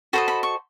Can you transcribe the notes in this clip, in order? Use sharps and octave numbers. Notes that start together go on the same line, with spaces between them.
F#4 A4 C5 D#5 B5
B5
C#6